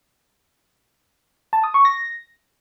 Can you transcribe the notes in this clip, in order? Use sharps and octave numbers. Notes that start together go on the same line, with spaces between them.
A5
D#6
C#6
A#6